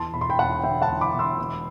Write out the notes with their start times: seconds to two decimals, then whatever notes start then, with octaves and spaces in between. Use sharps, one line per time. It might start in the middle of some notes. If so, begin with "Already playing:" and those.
Already playing: E2 A5 C6
0.13 E1 B5
0.21 C6
0.30 G5 B5
0.39 E1 F#5 A5
0.63 D3 E5 G5
0.82 F#5 A5
0.89 E2
1.01 B5 D6
1.13 E1
1.19 C6 E6
1.38 B2